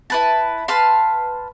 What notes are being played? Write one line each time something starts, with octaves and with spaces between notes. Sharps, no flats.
E4 B4 A5
B4 F5 A5 C6